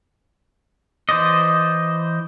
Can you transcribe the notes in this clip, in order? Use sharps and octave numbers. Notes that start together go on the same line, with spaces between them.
E3 C5 D5 D#5